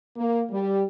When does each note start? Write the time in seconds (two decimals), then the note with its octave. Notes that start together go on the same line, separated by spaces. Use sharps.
0.17 A#3
0.52 G3